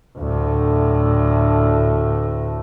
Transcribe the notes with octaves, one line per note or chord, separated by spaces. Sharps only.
D2 A2